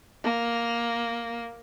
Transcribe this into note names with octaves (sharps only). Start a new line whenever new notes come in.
A#3